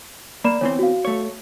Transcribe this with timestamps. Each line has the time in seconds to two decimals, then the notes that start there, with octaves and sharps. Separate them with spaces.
0.44 A#3 D5 B5 E7
0.61 E2 E3 C4 C#5
0.79 F#4 F5
1.05 A3 C#5